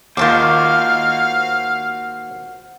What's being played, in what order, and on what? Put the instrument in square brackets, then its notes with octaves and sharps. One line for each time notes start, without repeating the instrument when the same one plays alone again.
[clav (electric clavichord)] D#2 D#3 [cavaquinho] F4 A5 D6 [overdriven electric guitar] F#4 C5 [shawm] F5